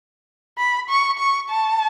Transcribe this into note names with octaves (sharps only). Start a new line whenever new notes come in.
B5
C#6
C#6
A5